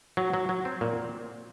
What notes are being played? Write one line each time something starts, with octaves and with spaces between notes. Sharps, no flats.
F#3
F#3
F#3
C4
A#2